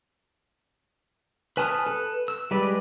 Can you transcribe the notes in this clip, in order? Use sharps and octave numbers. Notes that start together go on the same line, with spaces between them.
B4 G#5 A5 D#6 F6
A4 B4
E6
G3 G#3 B4 D5